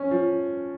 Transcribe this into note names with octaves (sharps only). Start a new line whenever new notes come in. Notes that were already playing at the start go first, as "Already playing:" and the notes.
Already playing: C#4
F3